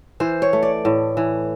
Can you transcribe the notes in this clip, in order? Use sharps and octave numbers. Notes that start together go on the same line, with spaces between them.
E3 C5
C#5
A3
D5
A2
E3